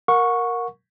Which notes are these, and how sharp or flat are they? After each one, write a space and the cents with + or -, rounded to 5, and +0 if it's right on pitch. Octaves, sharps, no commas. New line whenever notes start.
A#4 +0 F#5 -35 C#6 +0